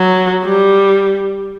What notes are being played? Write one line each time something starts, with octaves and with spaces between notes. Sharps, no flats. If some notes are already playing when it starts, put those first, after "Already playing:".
Already playing: F#3
G3